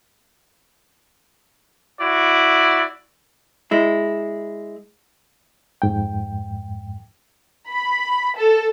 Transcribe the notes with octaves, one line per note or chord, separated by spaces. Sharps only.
E4 F#4 D5
G#3 E4
F2 G#2 G5
B5
A4